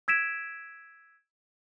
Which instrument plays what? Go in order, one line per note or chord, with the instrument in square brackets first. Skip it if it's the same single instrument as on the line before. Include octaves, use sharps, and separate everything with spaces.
[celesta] E6 G#6 B6 D7 E7